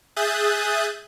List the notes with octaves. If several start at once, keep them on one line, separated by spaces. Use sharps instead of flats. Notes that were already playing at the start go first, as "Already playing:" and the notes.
G#4 E5 D#6 F#6 G6 A6